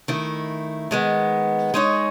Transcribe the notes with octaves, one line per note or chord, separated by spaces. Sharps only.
D#3 A3 E4
D#3 G#3 B3
G#3 D#4 G#4 C#5